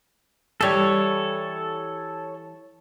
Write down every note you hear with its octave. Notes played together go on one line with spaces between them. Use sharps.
E3 G3 A4 C#5